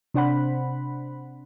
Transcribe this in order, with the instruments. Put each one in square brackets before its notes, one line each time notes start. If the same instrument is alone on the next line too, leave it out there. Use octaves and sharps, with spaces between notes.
[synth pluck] C3 D4 C5 F#5 B5